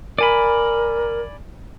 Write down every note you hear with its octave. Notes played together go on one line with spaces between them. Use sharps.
A#4 D5 G#5 B5